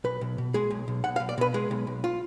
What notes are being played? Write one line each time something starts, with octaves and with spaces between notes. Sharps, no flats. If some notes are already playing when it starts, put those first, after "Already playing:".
B1 B4
B1
B2
G#3 G#4
B1
B1
B1 F#5
F5
B1
D5
B2 B4
G#3 G#4
B1
B1
F4